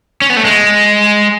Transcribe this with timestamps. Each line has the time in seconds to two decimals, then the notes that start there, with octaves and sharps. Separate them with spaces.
0.22 C#4
0.30 B3
0.37 A3
0.45 G#3